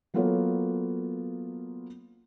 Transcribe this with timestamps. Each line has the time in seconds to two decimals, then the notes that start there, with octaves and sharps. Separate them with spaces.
0.14 F#3 A#3 B3 F4 A4 C#5